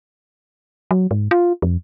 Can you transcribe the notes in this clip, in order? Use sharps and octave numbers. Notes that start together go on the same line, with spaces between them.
F#3
G#2
F4
F2